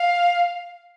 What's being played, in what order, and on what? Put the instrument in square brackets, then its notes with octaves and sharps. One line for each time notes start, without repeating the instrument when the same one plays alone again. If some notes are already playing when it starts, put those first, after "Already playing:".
Already playing: [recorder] F5